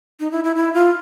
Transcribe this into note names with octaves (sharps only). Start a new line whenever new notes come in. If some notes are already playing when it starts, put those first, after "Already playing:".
D#4
E4
E4
E4
F4